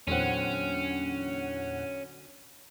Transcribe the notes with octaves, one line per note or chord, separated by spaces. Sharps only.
E2 A#2 D3 F#3 C4 C#4 F#5